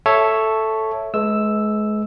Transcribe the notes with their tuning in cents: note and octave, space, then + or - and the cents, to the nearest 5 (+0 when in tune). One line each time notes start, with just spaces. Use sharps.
A4 +0 C#5 +0 E5 +0
G#3 +35 B4 +0 E6 +0